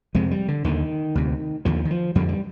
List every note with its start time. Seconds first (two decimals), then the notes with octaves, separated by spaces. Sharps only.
0.15 F2 C3 G#3
0.31 G3
0.48 D3
0.64 D#2 D3 D#3
1.15 D2 C3
1.65 D#2 D3 F3
1.85 D#3
1.91 F3
2.15 F2 D3 G3
2.29 G3